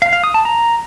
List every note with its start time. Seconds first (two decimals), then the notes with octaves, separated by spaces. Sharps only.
0.02 F5
0.13 F5
0.24 D#6
0.34 A5
0.45 A#5